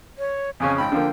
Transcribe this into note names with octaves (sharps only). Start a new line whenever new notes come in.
C#5
F2 C#3 C#4 G#5
G#1 G5 B5
D3 F3 A#3